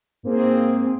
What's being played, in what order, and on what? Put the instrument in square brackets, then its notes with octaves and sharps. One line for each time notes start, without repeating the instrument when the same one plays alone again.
[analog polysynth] G#2 A#3 C4 G#4